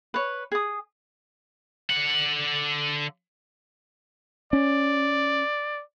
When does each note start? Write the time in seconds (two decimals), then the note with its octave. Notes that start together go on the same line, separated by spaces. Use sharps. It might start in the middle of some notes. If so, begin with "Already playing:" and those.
0.14 B4 C#5
0.52 G#4 D#6
1.90 D3 F#5
4.53 C#4 D5